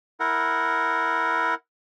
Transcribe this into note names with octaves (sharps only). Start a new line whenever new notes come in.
E4 A#4 F#5